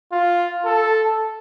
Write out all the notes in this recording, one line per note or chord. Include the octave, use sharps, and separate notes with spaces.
F4
A4